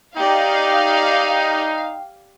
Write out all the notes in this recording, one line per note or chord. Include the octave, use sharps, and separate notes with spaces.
D#4 G4 D5 F5 G5